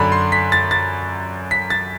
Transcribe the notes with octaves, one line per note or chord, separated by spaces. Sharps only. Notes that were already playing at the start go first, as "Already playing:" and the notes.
Already playing: F#2 D3 B5
C6
B6
A6
A6
B6
A6